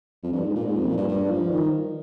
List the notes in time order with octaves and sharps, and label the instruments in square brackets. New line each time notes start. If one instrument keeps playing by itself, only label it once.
[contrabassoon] F2
G2
G#2
A#2
G#2
F2
A#2
G2
G2
F3
D#3